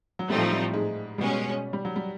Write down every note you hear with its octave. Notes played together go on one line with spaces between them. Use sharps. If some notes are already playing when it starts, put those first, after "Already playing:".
F#3
A2 F3 G3 A3 C4 D#4
G3
G#2 G#3
B2 G3 G#3 C#4
G3
F#3
G3